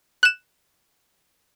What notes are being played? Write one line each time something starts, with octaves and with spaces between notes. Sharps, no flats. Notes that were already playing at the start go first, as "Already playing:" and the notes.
F#6 E7